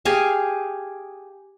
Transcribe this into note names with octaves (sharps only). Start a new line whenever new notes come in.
G4 G#4 F5 G#5